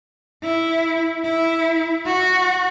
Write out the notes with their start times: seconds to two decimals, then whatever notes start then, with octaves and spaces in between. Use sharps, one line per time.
0.43 E4
1.25 E4
2.06 F#4